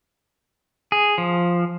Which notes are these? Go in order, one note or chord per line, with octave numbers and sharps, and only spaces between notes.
G#4
F3